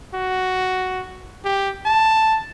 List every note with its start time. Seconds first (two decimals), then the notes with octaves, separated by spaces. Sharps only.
0.14 F#4
1.45 G4
1.86 A5